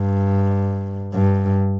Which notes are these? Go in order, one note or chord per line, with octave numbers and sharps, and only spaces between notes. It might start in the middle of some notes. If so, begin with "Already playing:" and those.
Already playing: G2
G2